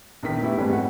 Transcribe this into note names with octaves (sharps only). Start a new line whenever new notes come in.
A#1 E2 D#3 B6
A3 B3 E4 G4 E5
F2 G#2 E3 G3 A3 C#4
F2 F#5